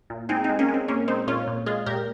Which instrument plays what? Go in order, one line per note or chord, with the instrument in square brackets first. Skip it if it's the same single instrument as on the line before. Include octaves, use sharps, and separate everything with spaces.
[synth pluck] A#2
G#3 C4 D#4
C4 D#4
G#3
A#3 C#4
G#3
C4
A#2 A#3 C#4
G#3 C4 D#4
A#2 C#4 F4
A#2
G#3 F4 G#4
A#2 G4 A#4